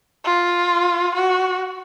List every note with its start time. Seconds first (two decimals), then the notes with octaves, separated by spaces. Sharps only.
0.25 F4
1.15 F#4